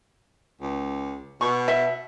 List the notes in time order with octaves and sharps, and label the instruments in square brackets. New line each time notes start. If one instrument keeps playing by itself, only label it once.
[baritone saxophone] C#2
[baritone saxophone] B2 [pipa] C#6
[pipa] E5